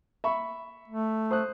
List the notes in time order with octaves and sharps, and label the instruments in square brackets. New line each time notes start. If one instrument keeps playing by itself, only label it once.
[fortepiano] E5 B5 C#6
[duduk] A3
[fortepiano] C5 D#6 F#6